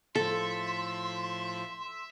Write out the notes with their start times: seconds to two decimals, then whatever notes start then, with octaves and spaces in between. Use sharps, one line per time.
0.15 A2 F3 A4 E5 C6